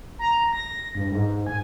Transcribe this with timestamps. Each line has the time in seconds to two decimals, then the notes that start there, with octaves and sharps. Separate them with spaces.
0.19 A#5
0.53 A#6
0.95 G2
1.11 G#2
1.46 G#5